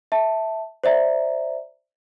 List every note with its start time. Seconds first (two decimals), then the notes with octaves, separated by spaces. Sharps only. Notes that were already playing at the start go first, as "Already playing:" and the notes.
0.12 E5 A5
0.84 C5 D5 E5 A#5